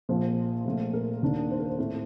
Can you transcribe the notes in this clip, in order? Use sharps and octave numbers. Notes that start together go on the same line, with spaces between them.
A#1 A#2 F3 A#3 C5
A#1 A#2 A3
A#4
D#2 D#3 A#3 D4
C5
A#4
C5
A2 A3 C4